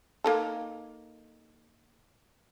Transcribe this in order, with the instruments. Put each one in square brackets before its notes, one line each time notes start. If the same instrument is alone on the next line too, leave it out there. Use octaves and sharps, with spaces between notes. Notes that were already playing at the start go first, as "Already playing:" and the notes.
[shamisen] A#3 D#4 A4